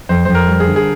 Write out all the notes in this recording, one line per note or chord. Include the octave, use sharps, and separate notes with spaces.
F2 C5
F2 C5
A#4
G3
G#4
D3
G#4